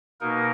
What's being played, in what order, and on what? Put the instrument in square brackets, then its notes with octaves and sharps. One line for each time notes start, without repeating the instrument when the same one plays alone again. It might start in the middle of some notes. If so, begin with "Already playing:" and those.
[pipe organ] B2 A#3 D#4 A#4